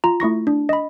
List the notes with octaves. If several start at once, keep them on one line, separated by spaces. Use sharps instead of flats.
F4 A#5
A3 E4 C#6 A#6
D4
D#5 B5